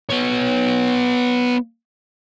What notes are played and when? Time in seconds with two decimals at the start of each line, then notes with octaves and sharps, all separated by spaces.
0.10 B3 C#5